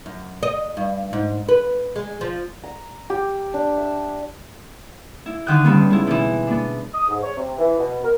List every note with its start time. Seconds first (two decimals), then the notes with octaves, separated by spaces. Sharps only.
0.06 F#2
0.43 D#5
0.77 G2
1.13 G#2
1.49 B4
1.96 G#3
2.21 F3
2.64 A#5
3.10 G4
3.54 D4
3.78 E5
5.26 E4
5.46 D3 D#3 D#6 F#6 G6
5.65 G2 C#3 B3
5.90 G#3 E4
6.07 B2 E3
6.47 B3 D4
6.94 D#6
7.08 G#2
7.23 C#5
7.37 C3
7.58 E3
7.78 B2
8.04 A#4